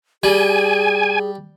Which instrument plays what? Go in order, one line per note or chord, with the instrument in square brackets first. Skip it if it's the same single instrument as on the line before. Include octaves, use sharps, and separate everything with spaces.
[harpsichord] G3 [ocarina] G#4 [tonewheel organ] G#5